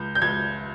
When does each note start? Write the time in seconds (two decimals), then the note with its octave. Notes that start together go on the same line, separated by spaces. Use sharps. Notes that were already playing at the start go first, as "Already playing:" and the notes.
Already playing: C#2 G6
0.15 G6
0.22 C#2 G#6